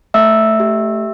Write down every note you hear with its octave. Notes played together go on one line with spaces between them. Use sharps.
A3 E5 E6
G4